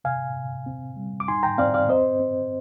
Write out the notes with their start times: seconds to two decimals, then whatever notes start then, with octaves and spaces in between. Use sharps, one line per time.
0.04 C3 F5 G#5
0.35 C3
0.66 C4
0.97 G3
1.20 D6
1.28 D#4 G#5 C6
1.43 G5 A#5
1.58 C4 D5 F5
1.74 D5 F5
1.89 C4 C5 D#5
2.20 C4